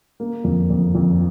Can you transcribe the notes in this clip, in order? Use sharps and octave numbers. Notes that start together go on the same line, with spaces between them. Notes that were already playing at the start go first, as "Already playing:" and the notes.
A#3
F2
F2
F2